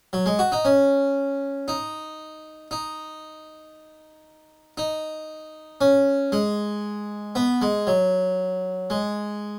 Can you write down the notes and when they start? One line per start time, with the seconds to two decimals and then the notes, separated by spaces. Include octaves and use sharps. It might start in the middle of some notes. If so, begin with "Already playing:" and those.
0.13 F#3
0.26 G#3
0.39 F#4
0.52 D#4
0.65 C#4
1.68 D#4
2.71 D#4
4.77 D#4
5.81 C#4
6.32 G#3
7.35 B3
7.61 G#3
7.87 F#3
8.90 G#3